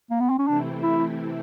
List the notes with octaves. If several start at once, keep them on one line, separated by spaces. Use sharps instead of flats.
A#3
B3
C4
C#4
C3 E3 A3 C4 D4 E4
E4